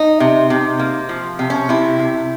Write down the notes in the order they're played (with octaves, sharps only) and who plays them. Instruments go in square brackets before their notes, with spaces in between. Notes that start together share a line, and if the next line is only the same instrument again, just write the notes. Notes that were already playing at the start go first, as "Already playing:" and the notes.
Already playing: [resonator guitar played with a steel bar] D#4
C3
C3
A#3
F3
C3
C#4
C3 E4
C3